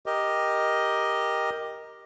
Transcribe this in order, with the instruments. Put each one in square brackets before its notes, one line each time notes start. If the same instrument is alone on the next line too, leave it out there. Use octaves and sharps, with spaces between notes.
[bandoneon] G4 A#4 D#5